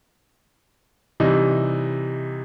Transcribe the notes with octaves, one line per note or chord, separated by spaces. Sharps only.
C3 E3 G3 D#4